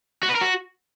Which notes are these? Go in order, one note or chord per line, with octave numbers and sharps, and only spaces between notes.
F#4
B4
A#4
F#4